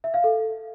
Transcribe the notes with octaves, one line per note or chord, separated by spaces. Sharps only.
E5
F5
A4